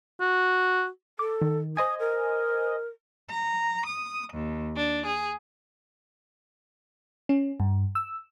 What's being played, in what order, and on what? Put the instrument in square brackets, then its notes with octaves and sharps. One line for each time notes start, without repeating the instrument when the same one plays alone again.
[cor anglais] F#4
[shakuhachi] A4 [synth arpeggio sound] D6
[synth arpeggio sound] D#3
[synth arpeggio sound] C5 D#5 G#5 [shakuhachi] D#6
[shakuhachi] A#4
[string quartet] A#5
D#6
D#2
D4
G#4
[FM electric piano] C#4
G2
E6